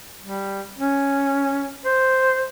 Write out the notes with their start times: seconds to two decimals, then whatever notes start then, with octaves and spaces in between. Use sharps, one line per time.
0.22 G3
0.78 C#4
1.85 C5